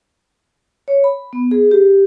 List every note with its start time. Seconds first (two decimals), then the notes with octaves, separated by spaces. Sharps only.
0.88 C#5
1.04 B5
1.33 B3
1.51 G#4
1.71 G4